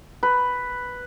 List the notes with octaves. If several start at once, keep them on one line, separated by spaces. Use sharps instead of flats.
B4